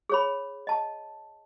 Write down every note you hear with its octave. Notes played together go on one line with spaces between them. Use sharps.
G#4 C#5 B5
D#5 A5